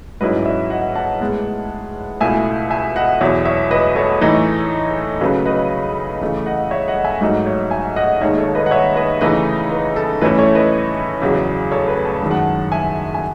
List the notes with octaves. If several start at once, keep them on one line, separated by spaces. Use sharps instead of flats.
G#2 F#3 C#4 E4 B4 D#5
D#5
C#5 E5
D#5 F#5
F#5 A5
A2 G#3 B3
C#2 B2 A3 E4 E5 G#5
E5 G#5
D#5 F#5
E2 B2 F#3 C#5 E5
C#5 E5
B4 D#5
A4 C#5
A2 E3 A3 D#4
C#3 F#3 A3 C#4 B4
B4 D#5
C#3 E3 A3
D#5 F#5
C#5 E5
D#5 F#5
E5 G#5
G#2 F#3 A3 D#4 D#5 F#5
C#5 E5
E5 G#5
D#5 F#5
D#2 D#3 G#3 D#4 C#5 E5
A4 C#5
B4 D#5
F#5
C#5 E5
B4 D#5
C#3 E3 A3 D#4 B4
B4
A4
A2 E3 A3 C#4 E4 B4
A4 C#5
B4 D#5
E2 C#3 F#3
A4 C#5
B4
A5
F#2 D#3 G#3
F#5 A5
E5 G#5
G#5